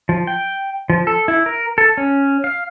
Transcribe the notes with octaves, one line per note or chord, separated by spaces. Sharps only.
F3
G5
F3
A4
E4
A#4
A4
C#4
F5